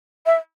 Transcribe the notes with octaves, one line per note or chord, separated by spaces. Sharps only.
E5